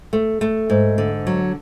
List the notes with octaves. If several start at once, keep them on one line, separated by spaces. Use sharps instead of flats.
A3
A3
G#2
D3
F#3